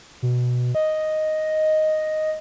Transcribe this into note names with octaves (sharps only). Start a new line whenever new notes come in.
B2
D#5